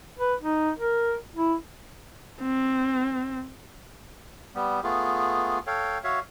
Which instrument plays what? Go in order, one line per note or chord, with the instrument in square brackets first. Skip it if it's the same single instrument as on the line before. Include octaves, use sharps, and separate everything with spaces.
[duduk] B4
D#4
A#4
E4
[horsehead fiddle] C4
[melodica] G3 B3
A3 B3 F4 G#4
A4 C#5 F5 G5
F#4 C#5 E5 F5